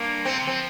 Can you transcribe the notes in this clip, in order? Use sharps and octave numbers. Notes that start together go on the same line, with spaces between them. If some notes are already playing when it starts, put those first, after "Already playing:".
Already playing: G2 A#3
A#2 C4
C3
D3
F3 C4